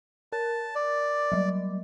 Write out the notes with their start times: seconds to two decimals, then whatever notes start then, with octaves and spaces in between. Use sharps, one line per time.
0.33 A#4 A5
0.75 D5
1.32 F#3 G3